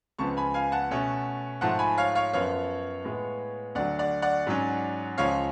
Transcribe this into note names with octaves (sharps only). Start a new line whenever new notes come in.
C#2 C#3 F3 B3 A5 C#6
G#5 B5
F5 G#5
F#5 A5
B2 A3 C#4
G#2 F3 A3 F#5 A5
G#5 B5
C#5 F5
C#5 F5
F#2 F3 B3 C#5 F5
A2 G#3 B3
D2 D3 F#3 D5 F#5
D5 F#5
D5 F#5
G#2 F#3 C#4
C#2 C#3 F3 C#5 F5